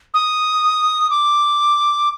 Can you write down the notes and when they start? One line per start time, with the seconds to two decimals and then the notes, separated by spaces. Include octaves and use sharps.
0.14 D#6
1.10 D6